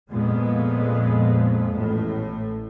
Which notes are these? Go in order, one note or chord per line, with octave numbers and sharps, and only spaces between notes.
F2 A#2 G#3 B3
A1 A2